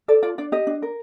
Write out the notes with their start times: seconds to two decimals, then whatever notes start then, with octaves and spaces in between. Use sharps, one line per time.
0.08 A4 D5
0.23 F4 D5
0.38 D4 D5
0.52 G4 D#5
0.67 D4
0.82 A#4